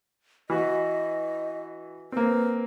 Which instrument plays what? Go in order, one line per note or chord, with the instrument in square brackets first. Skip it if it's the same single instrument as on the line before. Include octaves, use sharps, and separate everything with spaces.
[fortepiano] E3 F#4 [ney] D#5
[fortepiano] A#3 C4 [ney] B4